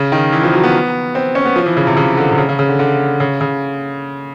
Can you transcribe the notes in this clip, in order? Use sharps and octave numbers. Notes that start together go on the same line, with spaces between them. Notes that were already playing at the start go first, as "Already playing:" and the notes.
Already playing: C#3
D#3
E3
F3
F#3
B3
C4
C#4
B3
F3
E3
C#3
C3
C#3
D3
C3
C#3
C#3
C#3
D3
D3
C#3
C#3